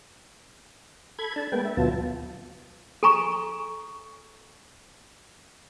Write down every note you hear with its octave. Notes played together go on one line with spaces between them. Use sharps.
A4 B5 G#6
D4 A5
G#3 A#3 B3 B4 G5
E5
D2 B2 F#3 B3 F4 A5
A4 G#5 A#5 C#6